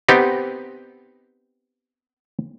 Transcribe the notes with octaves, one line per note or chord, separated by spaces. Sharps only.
B3 C4 D#4 G4